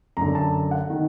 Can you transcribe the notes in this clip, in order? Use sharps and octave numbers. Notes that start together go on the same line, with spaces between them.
F#2 D3 A#5
A5
F#5
D#3